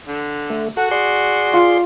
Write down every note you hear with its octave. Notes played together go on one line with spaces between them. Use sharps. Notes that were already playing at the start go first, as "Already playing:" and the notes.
D3
A3
F#4 A4 F#5
G#4 D5 C6
F4